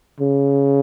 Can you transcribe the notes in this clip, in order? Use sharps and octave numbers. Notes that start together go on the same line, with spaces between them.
C#3